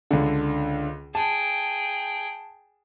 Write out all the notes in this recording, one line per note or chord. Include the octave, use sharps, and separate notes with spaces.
C#2 D3
G#4 G5 A5